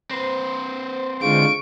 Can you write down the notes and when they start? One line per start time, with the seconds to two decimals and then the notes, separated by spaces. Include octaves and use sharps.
0.11 C4 B4 C5
1.23 D3 G#3 F4 C#6 D7